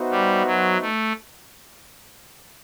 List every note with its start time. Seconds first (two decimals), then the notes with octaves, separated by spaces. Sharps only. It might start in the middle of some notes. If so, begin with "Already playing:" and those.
Already playing: B3 D#4 F#4 C5 E5
0.11 G3
0.46 F#3
0.81 A3